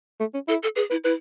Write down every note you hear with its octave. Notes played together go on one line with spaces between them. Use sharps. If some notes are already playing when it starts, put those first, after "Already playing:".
A3
C#4
E4 A4
A4
G#4 B4
E4 B4
E4 B4